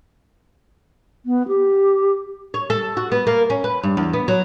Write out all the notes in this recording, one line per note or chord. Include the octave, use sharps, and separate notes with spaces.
B3
G4
C#5
A4
F#4
B3
A#3
C#4
B4
G2
E2
B3
F#3